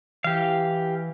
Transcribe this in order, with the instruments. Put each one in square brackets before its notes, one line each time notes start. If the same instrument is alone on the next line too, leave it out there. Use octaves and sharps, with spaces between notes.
[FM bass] E3 [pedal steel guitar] G4 F5